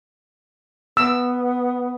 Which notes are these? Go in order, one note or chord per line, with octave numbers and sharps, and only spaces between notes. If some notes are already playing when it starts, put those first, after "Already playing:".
B3 E6